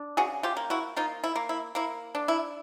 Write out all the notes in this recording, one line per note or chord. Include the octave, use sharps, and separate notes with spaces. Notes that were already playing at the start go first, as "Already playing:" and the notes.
Already playing: D4
C#3 F#4 G#4
F4 G4
A#3
E4 F#4
A#3 D#4 F4
E4
A#3
E4
A#3 E4
D4
E4